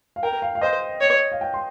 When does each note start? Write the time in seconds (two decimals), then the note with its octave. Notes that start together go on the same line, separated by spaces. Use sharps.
0.16 F5
0.23 A#4 G5
0.42 F5
0.55 F5
0.61 C5 D#5
1.01 C#5
1.32 F5
1.41 G5
1.54 C6